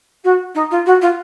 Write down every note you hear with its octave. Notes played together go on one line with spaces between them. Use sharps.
F#4
D#4
F4
F#4
F4